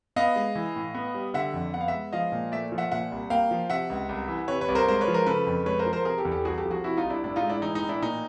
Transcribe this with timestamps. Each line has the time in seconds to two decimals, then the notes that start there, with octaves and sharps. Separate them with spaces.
0.16 B3 D#5 F5
0.36 G#3
0.55 E3
0.76 A2
0.95 B3
1.15 G3
1.34 D3 E5 F#5
1.54 F2
1.74 B3 F#5
1.81 F5
1.88 E5 F#5
1.94 G#3
2.13 F3 D#5 F5
2.32 A#2
2.52 A3 D5 E5
2.72 F3
2.78 E5 F#5
2.91 A#2 E5 F#5
3.12 C2
3.30 A#3 F5 G5
3.51 F3
3.69 C3 E5 F#5
3.90 C#2
4.09 C2
4.28 E3
4.48 C3 B4 C#5
4.61 B4 C#5
4.68 C2
4.75 A#4 C5
4.88 G#3 A#4 C5
5.01 B4 C#5
5.08 F3
5.13 A#4 C5
5.26 C#3 A4 B4
5.47 F2
5.66 G#3 B4 C#5
5.79 A#4 C5
5.86 F3
5.93 A#4 C5
6.05 C3 G#4 A#4
6.18 G4 A4
6.25 E2
6.32 G4 A4
6.45 C2 F#4 G#4
6.58 G4 A4
6.65 F3
6.71 F#4 G#4
6.84 C3 E4 F#4
6.97 D#4 F4
7.03 C2
7.10 D4 E4
7.24 A2 D4 E4
7.36 D#4 F4
7.42 G#3
7.49 D4 E4
7.62 E3 D#4
7.75 D#4
7.82 A2
7.89 D4 E4
8.02 A#2 D#4